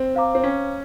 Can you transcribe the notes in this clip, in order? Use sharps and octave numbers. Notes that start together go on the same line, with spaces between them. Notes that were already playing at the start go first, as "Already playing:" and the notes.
Already playing: C4
C5 F5 A#5 D6
C4
C#4